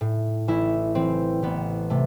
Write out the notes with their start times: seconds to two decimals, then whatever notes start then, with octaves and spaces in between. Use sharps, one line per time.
0.01 A2
0.48 A1 E4
0.95 E3 C4
1.42 A1 B3
1.90 C3 A3